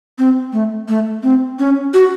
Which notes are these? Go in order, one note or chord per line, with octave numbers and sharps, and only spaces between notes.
C4
A3
A3
C4
C#4
F#4